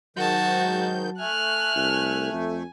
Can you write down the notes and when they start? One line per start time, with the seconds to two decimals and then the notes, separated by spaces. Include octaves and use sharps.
0.17 G#2 D#3 F#3 F#4 A5 G6
1.19 A3 G#5 F6 F#6
1.76 C2
2.33 F2